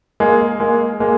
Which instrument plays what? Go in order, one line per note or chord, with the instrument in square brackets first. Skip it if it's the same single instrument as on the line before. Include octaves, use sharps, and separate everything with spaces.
[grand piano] G#3 A#3
G#3 A#3
G#3 A#3